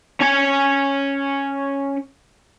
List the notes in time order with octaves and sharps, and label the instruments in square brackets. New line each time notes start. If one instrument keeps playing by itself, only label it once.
[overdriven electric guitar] C#4 G#5